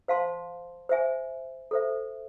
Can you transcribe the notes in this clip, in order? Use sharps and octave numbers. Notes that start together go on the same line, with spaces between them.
C5 F5 A5 C6
C5 E5 G#5
A4 C5 E5